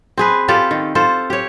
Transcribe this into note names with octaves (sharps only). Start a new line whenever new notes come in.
C4 G#4 B4
F4 G4 A4 D5
D#3
F4 A4 C5
G4 C#5